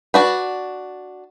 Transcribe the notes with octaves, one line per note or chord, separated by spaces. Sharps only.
D4 F#4 B4